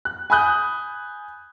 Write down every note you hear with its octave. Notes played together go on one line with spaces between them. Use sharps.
F#6
G#5 B5 D#6 F#6 G6